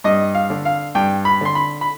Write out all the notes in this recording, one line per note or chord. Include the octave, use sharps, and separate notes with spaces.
G2 D#5
F5
D3
F5
G2 G5
B5
D3 C6
B5
B5